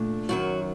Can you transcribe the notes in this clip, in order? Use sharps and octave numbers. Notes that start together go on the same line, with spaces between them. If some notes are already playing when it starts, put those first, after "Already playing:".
Already playing: A#2 A3 D4
F#2 D#3 F#3 F#4